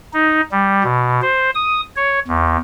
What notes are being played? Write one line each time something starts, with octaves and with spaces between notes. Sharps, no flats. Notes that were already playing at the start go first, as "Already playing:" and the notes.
D#4
G3
B2
C5
D#6
C#5
E2